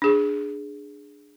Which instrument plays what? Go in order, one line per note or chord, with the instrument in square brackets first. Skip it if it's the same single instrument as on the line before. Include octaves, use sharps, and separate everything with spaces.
[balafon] D4 G#4